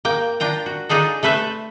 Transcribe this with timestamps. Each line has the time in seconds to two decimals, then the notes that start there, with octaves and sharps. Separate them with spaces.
0.05 A#3 G5
0.40 D4 F4 G5 A#5
0.66 F#4
0.89 D4 D#4 F4 G#4 A4
1.23 A3 A4 B4 C5 E5